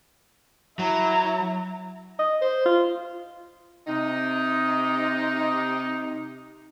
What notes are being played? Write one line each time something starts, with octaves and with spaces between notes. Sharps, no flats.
F#3 E4 A#5
D#5
C5
F4
C3 D#4